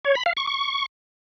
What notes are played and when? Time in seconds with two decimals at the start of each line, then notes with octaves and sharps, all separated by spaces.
0.05 C#5
0.15 B5
0.26 F5
0.37 C#6
0.47 C#6